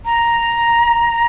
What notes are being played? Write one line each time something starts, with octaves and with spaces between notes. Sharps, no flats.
A#5